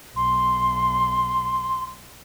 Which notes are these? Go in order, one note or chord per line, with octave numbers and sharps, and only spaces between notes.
B1 C6